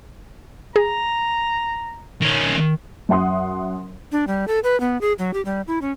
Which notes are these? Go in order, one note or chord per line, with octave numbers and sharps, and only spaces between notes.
G#4 A#5
D#3 C#4
F#2 E5 F#5 C6 D#6
D4
G3
A4
B4
B3
G#4
F#3
G4
G3
E4
C#4